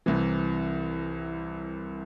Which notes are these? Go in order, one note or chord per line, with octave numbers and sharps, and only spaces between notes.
C2 C3 E3